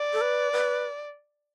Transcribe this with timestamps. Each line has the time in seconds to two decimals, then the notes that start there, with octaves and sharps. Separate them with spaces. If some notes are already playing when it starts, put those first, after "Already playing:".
Already playing: D5
0.13 A4
0.21 B4
0.53 B4